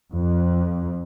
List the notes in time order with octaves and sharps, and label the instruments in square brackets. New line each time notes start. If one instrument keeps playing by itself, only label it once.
[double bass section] F2